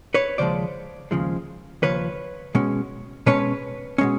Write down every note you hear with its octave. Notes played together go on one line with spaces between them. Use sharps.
B4 C#5
D#2 C#3 F3 G#3 C5 D5
D#2 C#3 F3 G#3
D#2 C#3 F3 B4 C#5
B2 G#3 C#4
B2 G#3 C#4 B4 C#5
B2 G#3 C#4